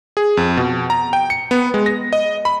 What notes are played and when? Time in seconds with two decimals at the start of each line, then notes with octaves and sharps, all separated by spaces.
0.17 G#4
0.37 F2
0.57 B2
0.90 A#5
1.13 G5
1.30 C#7
1.51 B3
1.74 G#3
1.86 A#6
2.13 D#5
2.45 B5